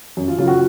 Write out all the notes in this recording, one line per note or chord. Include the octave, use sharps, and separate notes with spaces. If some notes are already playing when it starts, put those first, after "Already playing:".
F#2
F4
C#3 F#3 F4
F#4